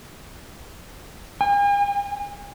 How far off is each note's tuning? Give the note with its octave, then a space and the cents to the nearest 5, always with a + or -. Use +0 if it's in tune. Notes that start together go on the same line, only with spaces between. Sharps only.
G#5 -45